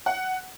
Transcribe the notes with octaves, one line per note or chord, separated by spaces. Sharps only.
F#5